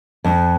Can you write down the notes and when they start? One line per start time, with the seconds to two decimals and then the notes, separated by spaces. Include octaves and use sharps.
0.24 F2